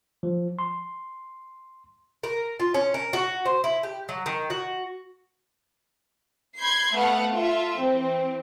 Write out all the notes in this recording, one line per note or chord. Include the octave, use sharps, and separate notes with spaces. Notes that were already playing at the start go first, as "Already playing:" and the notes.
F3
C6
A#4
F4
C#4
A#4
F#4
C5
E4
G4
F#3
D#3
F#4
B5 C6 G6 G#6 C7
A3 B3 A4 F5 F#5
F4 A4 E5
E3 C4